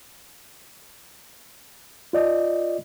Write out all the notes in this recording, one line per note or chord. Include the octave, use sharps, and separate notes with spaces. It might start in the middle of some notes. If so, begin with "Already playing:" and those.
F4 D5 D#5